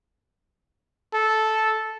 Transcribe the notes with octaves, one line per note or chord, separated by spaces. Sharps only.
A4